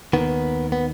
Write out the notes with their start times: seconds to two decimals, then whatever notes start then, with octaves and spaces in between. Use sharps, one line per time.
0.13 D#2 D#3 B3
0.72 B3